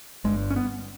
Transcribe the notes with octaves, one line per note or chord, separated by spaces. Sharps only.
G1 G2 G#3
C#4
B3